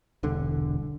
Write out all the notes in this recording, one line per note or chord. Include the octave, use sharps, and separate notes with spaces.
E1 C2 D3